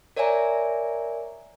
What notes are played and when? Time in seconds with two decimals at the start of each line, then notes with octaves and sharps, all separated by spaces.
0.17 A#4 C#5 D5 E5 G#5 A#5